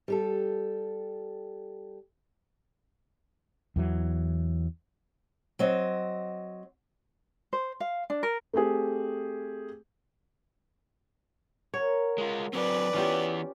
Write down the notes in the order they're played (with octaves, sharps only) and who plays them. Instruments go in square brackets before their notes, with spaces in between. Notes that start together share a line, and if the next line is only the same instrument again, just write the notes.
[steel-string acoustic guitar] G3 G4 A4
[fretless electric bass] E2 E3 F#3
[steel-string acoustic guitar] F#3 C4 D#5
[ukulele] C5
F5
D4
A#4
[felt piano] A3 C4 G4 G#4
[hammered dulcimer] F#4 A#4 A#5 [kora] C#5
[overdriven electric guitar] G#3 F4
[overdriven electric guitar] F#3 C4 [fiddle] B4 D5 [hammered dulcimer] G5 G#5
[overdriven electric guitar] E3 B3 [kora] C#4 F4 G4